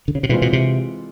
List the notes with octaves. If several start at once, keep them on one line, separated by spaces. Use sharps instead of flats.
D3
C#3
C3
B2 E3 G#3 C4 F4
B2
C3